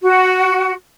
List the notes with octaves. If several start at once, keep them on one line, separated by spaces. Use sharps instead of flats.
F#4